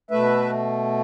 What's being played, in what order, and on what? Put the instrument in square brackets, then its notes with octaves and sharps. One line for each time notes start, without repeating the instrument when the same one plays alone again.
[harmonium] B2 A3 B4 E5